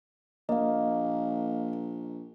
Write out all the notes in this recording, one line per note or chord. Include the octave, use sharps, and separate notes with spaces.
A#1 A#3 D#5 F5